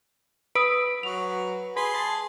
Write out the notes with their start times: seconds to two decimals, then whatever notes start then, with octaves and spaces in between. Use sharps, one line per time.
0.55 B4 D#6 E6 D7
1.03 F#3 F#4 F7
1.77 G#4 B4 C6
1.95 A5